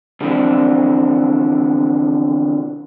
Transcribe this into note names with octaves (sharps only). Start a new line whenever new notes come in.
B2 D3 E3 F3 C4 D4